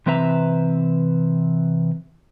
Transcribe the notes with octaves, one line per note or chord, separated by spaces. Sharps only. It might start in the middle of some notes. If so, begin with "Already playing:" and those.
C3 E3 C4 B4 E5 A#5